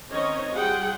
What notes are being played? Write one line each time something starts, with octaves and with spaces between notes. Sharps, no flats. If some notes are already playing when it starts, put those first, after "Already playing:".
D#3 C4 C#4 C#5 D#5
G3 F4 G#4 F#5 G5